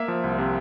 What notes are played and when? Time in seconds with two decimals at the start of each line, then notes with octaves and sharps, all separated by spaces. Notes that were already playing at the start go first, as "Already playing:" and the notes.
Already playing: A#3 E5
0.08 F3
0.24 C2
0.38 C3